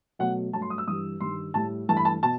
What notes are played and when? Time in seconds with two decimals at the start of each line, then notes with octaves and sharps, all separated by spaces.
0.19 B2 F#3 A3 F#5
0.53 G2 F#3 A3 A5
0.62 C6
0.70 D#6
0.78 E6
0.87 G2 E3 G3 D#6
1.21 G2 D#3 G3 C6
1.54 A2 G3 A5
1.88 G2 E3 A3 A5
1.97 B5
2.05 A5
2.23 B2 A5